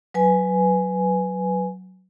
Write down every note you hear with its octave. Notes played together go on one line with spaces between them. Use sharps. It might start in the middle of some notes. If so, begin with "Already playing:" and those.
F#3 B4 G#5